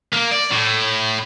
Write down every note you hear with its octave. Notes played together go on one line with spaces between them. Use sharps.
A#3
D5
A2